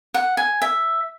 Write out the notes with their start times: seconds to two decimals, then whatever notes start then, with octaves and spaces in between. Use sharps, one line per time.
0.14 F#5
0.37 G#5
0.62 E5